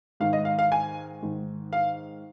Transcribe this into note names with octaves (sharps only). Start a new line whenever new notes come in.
G#2 D#3 F5
D#5
F5
F5
G#5
G#2 D#3
F5